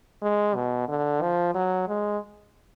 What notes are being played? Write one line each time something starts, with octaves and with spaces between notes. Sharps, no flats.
G#3
B2
D3
F3
F#3
G#3